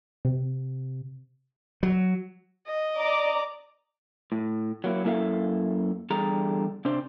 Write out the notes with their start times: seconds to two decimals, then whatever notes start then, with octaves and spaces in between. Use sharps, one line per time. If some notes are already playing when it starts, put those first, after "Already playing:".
0.25 C3
1.83 F#3
2.66 D#5
2.97 D5 A#5 D6
4.32 A2
4.84 F#3 A#3 E4
5.04 F#2 A#3 E4 A4 E5 F5
6.10 E2 D3 G3 G#4 A4 A#5
6.85 C3 D4 C5